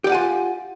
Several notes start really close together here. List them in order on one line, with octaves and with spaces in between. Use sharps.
G4 D5 F#5 G#5 F4